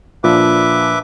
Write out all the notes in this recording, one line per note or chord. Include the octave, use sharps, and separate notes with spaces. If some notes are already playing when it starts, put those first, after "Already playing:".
A#2 F3 D4 B4 E5 D6